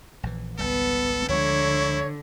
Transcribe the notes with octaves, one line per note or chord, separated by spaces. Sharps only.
A#1 E3
G#1 C#2 G3 B3 A4
D2 D3 F3 G#3 E4 C#5